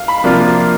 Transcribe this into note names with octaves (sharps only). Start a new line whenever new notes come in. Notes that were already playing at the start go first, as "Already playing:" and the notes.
Already playing: F5
B5
C3 F3 A#3 D4 F4